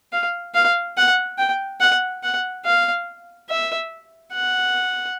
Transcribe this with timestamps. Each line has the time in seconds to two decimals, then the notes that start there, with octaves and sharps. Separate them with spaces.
0.12 F5
0.55 F5
0.98 F#5
1.38 G5
1.81 F#5
2.23 F#5
2.65 F5
3.49 E5
4.33 F#5